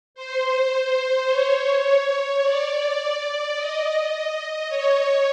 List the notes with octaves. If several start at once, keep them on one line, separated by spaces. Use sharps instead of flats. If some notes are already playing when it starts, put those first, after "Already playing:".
C5
C#5
D5
D#5
C#5